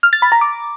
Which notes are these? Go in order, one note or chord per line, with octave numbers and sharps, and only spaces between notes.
F6
A6
B5
A#5
D6